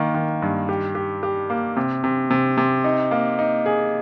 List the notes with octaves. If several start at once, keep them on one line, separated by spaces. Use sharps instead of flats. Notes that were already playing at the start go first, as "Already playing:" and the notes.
Already playing: D#3 A#3
D#3
G2
G4
G4
G4
A#3
C3
C3
C3
C3
D#4
A#3
D#4
G#4